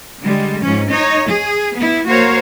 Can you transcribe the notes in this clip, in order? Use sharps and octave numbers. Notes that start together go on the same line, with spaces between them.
D3 G3 G#3
G#2 F3 C#4
D#4 C#5 D#5
G#4
B3 E4
A#3 F#4 A#4 C5 C#5 F5